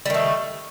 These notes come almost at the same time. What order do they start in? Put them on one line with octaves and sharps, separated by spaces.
G3 D#3 A3